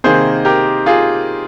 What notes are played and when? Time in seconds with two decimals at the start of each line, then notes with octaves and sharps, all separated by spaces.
0.04 C3 D#3 A#3 G#4 C5
0.45 G4 A#4
0.86 F4 G#4